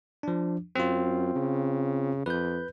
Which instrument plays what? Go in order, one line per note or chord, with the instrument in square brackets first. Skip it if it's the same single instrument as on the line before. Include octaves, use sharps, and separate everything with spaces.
[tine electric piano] F3 D4
[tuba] F#2 [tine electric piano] C4 F4
[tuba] C#3
[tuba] F2 [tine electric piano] B4 G6